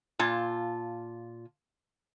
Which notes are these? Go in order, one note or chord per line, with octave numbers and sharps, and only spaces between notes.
A#2 F4 A5